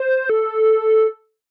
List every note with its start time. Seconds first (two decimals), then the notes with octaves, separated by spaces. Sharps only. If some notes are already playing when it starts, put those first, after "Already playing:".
Already playing: C5
0.30 A4